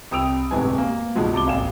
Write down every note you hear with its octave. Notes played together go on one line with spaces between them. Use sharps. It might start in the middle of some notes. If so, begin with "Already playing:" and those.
C2 G5 D#6 E6 D7 F7
D1 G2 C3 G#3 B3 G#5
A#3
C#2 G2 B2 F3 G#3
C2 A5 D6 G7
D#1 A1 F5 G#5 E7